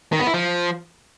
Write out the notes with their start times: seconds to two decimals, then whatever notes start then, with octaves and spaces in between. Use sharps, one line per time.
0.12 D#3
0.20 B3
0.27 E4
0.34 F3